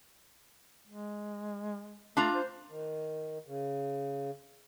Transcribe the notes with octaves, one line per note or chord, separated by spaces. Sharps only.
G#3
A3 D4 F4 A#5
C5
D#3
C#3